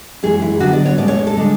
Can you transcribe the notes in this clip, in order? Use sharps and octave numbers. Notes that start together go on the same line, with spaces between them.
F#2 E3 G#3 G#4
E4
D3 F#3 B3 D4 F#4
D5
C#5
A2 G#3 C#4 D5
C#5
A4
D3 G#3 D4